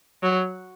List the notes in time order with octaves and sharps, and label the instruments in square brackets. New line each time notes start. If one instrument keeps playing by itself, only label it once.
[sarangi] F#3